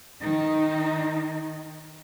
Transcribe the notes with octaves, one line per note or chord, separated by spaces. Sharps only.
D#3 D#4